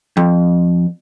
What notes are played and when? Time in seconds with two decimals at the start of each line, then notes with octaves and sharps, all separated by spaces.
0.17 F2